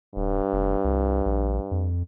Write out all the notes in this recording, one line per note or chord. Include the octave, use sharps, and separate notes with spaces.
D#1 G2
F1
C2
A#1
F2